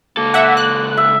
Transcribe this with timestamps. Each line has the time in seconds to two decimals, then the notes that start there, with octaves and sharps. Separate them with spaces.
0.17 C#2 A#3 A4
0.34 E5 F#5
0.57 F#6
0.97 E5